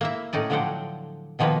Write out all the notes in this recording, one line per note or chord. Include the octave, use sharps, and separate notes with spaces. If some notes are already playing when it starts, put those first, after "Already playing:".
A#3 E4 E5
A2 C#4 D#4 D5
D3 F3 F#3 D4 F#5 G5
B2 D#3 F3 A#3 B3 B4